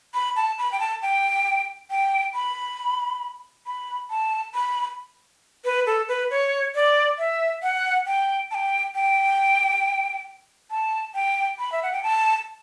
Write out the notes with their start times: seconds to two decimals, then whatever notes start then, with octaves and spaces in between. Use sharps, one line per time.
0.14 B5
0.36 A5
0.58 B5
0.72 G5
0.80 A5
1.02 G5
1.91 G5
2.34 B5
3.66 B5
4.10 A5
4.54 B5
5.65 B4
5.87 A4
6.08 B4
6.31 C#5
6.75 D5
7.19 E5
7.63 F#5
8.07 G5
8.51 A5
8.55 G5
8.95 G5
10.71 A5
11.15 G5
11.59 B5
11.72 E5
11.83 F#5
11.93 G5
12.03 A5